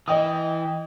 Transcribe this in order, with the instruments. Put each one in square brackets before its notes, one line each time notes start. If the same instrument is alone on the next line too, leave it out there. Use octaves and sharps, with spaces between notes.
[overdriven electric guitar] E3 [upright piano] D#5 G5 D#6